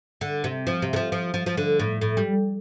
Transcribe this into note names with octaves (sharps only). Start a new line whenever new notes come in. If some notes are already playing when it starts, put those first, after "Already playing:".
D3
C3
F3
C3
D3
F3
F3
F3
F3
D3
A2
A2
G3